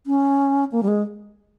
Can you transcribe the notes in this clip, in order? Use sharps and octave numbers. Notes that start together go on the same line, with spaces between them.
C#4
A#3
G3
G#3